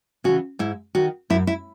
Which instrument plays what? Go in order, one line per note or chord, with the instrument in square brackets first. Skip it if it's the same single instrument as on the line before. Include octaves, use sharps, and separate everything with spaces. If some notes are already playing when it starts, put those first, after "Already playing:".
[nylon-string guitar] C#3 E3 F#4
G#2 E4
D#3 F#4
F#2 E4
E4